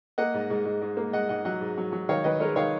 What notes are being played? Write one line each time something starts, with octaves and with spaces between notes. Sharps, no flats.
A#3 D#5 F#5
G#2
G#2
G#2
G#2
A#3
G#2 D#5 F#5
G#2 D#5 F#5
F#3 D#5 F#5
G#2
F#3
F#3
D#3 C#5 F5
D#3 B4 D#5
G#3 A#4 C#5
D#3 C#5 F5